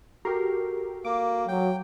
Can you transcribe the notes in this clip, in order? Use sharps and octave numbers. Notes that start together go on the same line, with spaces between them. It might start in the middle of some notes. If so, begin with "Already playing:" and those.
F#4 G4 A4 A#4 C7
A#3 D6
F#3 G5